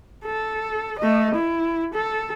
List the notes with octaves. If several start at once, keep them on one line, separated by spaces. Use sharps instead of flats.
A4
A3 D#5
E4
A4